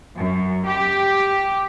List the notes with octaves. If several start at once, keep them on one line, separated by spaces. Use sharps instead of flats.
F#2
G4